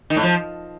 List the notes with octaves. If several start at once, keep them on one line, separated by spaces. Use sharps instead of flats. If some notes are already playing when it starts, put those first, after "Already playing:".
D#3
A2
F3